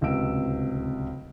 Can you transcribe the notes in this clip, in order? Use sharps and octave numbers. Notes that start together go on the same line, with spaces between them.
D1 C#2 C3 F#4 E6 D7